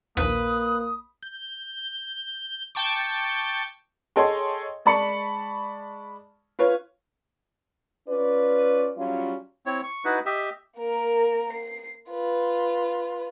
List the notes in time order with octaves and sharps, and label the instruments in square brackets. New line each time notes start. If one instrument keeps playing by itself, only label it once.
[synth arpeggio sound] A#1 D#2 [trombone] A#3 [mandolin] B4 [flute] D#6
[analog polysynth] G6
G5 A5 C#6 D6
[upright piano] G#4 A4 C#5 D#5 G5 C6
G#3 D5 A5 B5 C#6 C#7
F4 B4 C#5
[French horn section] C#4 F4 B4 D5
F#3 G3 C#4 F4
[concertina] C4 E4 C#5
C#6
D#4 E4 F#4 B4
G4 D#5 E5
[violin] A#3 A#4
C7
F4 B4